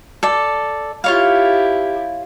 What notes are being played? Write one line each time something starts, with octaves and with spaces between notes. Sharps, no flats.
A4 D5
E4 F4 G4 C#5 F5